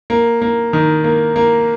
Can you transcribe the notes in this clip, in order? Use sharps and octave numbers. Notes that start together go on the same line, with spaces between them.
A#3
A#3
D#3
A#3
A#3